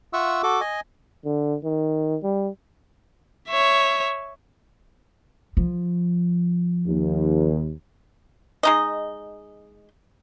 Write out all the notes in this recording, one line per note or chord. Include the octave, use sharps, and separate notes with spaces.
F4 E5 F#5 C#6 E6
F#4 A4 D6
D#5 G#5
D3
D#3
G3
C#5 E5
F3
D#2
G#3 D#4 D#5